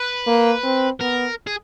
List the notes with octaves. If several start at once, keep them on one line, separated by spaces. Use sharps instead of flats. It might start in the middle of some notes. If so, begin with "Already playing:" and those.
Already playing: B4
A#3
C4
B3 A#4
G#4